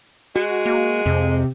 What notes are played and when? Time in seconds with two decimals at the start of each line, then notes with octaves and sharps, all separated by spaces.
0.36 G#3 F#4
0.66 A#3
1.06 F2 C3